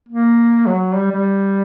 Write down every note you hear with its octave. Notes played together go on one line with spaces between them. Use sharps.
A#3
F#3
G3
G3